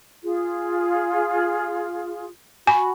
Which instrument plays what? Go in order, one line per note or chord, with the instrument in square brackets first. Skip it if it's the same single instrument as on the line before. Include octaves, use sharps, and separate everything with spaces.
[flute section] F4 G#4
[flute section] F#4 B5 [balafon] G#5